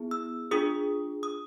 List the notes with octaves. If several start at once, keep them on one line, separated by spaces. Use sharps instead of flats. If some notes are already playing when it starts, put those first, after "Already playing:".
Already playing: B3 E4 G#4
E6
D4 F4 G#4 D#6
D#6